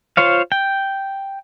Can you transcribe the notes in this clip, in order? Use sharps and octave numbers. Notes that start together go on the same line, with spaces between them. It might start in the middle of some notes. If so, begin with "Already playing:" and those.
F4 C5 C#5 F5
G5